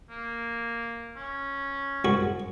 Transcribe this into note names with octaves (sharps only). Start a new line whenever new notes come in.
A#3
C#4
C2 F#4 C#6